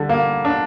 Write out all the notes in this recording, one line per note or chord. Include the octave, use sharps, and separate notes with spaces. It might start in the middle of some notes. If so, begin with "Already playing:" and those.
Already playing: D3 G3
A#3
D4